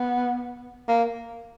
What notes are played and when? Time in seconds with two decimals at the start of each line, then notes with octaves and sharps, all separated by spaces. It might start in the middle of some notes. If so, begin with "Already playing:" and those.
Already playing: B3
0.88 A#3